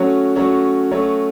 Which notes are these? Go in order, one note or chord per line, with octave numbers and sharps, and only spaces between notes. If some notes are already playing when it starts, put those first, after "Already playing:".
Already playing: F#3 A3 C#4 F#4 C#5
F#3 A3 C#4 F#4 C#5
F#3 A3 C#4 F#4 C#5